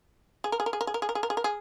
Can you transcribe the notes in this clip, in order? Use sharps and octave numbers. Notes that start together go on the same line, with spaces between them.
G#4
A#4
G#4
A#4
G#4
A#4
G#4
A#4
G#4
A#4
G#4
A#4
G#4
A#4
G#4